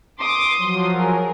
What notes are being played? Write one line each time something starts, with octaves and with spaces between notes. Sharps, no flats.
C6 D6 D#6
F3 F#3
G#4 A#4